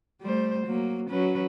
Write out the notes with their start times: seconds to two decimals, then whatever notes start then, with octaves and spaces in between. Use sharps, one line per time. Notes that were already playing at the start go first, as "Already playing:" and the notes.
0.22 G3 A3 C5
0.66 F#3 A#3
1.10 F#3 C#4 B4